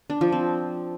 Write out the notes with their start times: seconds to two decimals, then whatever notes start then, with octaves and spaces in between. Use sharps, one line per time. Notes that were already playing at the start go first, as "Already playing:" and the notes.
0.10 D4
0.21 F3
0.32 C4